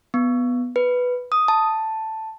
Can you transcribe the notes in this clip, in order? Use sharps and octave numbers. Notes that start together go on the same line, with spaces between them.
B3
B4
D#6
A5